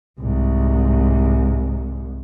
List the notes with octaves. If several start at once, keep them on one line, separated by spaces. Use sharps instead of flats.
C2 G#2